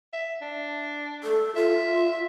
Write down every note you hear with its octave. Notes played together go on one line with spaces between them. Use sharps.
E5
D4
A4
F4 E5